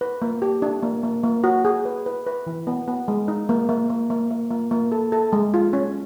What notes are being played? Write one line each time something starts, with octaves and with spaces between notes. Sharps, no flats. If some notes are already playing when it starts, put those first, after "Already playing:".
B4
A#3
G4
D4
A#3
A#3
A#3
F#4
G#4
B4
B4
B4
E3
B3
B3
G#3
D#4
A#3
A#3
A#3
A#3
A#3
A#3
A#3
A4
A4
G#3
F4
C#4